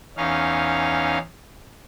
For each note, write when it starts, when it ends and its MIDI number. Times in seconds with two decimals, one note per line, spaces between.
0.17 1.18 40
0.17 1.18 61
0.17 1.18 63
0.17 1.18 77